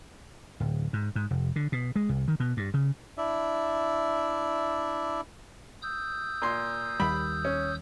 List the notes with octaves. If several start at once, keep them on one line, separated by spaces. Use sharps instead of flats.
D1
G#2
G#2
F1
D3
B2
G#3
C2
D#3
B2
G2
C#3
D4 E4 D5 E5
D#6 E6 G6
A#2 C6
D#2 G3 B5
C#4